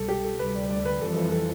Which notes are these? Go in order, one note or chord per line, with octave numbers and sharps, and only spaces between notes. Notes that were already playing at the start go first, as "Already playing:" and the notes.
Already playing: C2 B2 G3 A4
G4
A4
D2 C3 G3 B4
D5
D5
B4
F2 E3 G3 A4
A4
A4